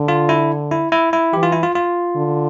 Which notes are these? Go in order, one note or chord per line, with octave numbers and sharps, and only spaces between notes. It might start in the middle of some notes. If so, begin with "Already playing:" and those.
Already playing: D3
F4
E4
E4
E4
E4
E3 G4
F4
E4
F4
F4
D3